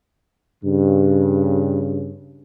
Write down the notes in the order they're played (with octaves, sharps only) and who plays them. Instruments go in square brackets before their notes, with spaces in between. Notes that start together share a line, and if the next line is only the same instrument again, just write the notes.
[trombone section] G2 C#3